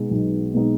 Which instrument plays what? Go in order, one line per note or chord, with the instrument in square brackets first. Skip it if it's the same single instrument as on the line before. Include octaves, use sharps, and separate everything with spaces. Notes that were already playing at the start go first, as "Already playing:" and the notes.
Already playing: [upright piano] B2 G#3 D#4
B1
B2 G#3 D#4